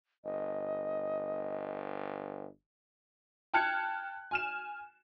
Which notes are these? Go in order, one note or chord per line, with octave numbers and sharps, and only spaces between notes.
G1 D#5
G5 A5 F6 F#6 G#6 C#7
G#5 F6 E7